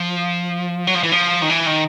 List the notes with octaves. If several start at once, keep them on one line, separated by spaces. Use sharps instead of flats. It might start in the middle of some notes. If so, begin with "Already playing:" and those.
Already playing: F3
F#3
F3
E3
F3
D#3
E3
D#3